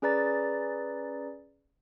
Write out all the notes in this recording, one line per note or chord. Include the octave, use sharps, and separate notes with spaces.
C#4 G#4 B4 D5 A#5 A6